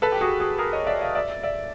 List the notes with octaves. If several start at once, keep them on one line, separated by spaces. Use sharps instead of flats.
A4 B4
G4
F#4 G#4
F#4 G#4
G#4 A#4
C#5 D#5
D5 E5
D#5 F5
D5 E5
D5 E5